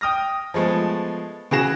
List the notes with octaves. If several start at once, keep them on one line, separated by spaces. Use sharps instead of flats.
G5 D#6 F6 A#6
F3 G#3 A3 B3
C#3 E3 F#4 G#4 A#6 E7